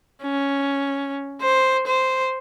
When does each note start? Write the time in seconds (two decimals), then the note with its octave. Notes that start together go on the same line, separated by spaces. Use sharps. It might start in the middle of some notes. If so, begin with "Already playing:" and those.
0.23 C#4
1.41 C5
1.87 C5